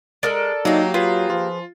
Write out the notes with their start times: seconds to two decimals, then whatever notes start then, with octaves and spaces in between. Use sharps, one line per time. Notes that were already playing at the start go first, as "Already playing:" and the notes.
0.23 G#3 A4 A#4 D5
0.65 F#3 A#3 D#4 G4
0.94 F#3 F4 G#4 B4
1.30 F3 F4